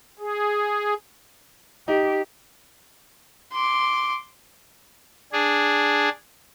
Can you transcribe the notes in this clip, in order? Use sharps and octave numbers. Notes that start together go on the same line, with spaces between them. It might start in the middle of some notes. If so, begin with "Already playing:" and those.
G#4
D#4 G4
C6 D6
D4 G#4